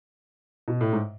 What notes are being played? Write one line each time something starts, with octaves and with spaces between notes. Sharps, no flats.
B2
A2
G#2